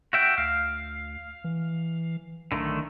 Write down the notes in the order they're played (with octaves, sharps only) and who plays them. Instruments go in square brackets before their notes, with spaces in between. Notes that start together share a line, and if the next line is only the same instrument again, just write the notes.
[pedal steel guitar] F#4 E5 G5
[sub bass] D2 [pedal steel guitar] F5
[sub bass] E3
[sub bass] B1 [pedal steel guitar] D3 D#3 A3